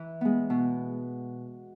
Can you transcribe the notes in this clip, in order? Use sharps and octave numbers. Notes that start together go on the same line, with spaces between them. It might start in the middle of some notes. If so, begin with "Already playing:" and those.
Already playing: E3
G#3 B3
B2